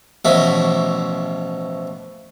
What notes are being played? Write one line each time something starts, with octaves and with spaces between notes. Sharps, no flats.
A1 B2 F3 E4